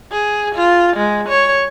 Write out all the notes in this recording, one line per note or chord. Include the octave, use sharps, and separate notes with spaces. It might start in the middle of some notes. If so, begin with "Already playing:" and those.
G#4
F4
G#3
C#5